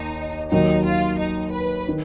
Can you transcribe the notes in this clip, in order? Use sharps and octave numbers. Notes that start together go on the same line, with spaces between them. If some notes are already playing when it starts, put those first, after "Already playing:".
Already playing: D#2 D#3 D#4
D#2 D#3 F#3 D#4
F4
D#4
B4
D#3